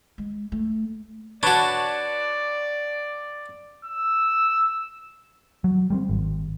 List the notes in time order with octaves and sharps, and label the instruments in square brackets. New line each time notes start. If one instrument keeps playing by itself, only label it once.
[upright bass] G#3
A3
[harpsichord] D4 F#4 [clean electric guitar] B4 C#5 A5 [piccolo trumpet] D5
[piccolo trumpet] E6
[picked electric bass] F#3
G3 G#3 C4
G#1